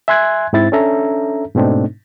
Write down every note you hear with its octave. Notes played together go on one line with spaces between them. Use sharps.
E5 G#5 C6 F#6 G#6
G#2 C4 E4 A6
C#4 D4 A4 E5 A#5
G#2 B2 A3 C4 D4 D#4